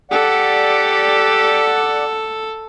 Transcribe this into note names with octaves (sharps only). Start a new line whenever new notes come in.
G4 A4 D5 F#5